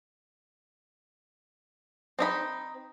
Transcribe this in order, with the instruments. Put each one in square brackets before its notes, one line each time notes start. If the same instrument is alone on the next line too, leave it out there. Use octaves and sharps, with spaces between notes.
[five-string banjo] C4 D#4 B5